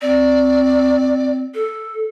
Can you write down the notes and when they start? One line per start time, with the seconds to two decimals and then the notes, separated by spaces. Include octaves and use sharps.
0.02 C4 D5
1.54 A4